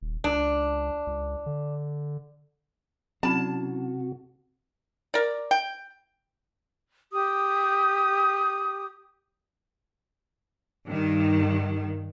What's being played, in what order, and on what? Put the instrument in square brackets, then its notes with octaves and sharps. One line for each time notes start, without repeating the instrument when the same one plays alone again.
[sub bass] D#1
[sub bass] C#2 [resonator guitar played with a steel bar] D4
[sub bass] C#2
D3
[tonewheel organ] C3 F#4 [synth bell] F#3 C#4 E4 [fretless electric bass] C4 [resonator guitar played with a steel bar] A5
[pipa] A#4 D5
G5
[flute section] G4 D#6
[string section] G2 D#3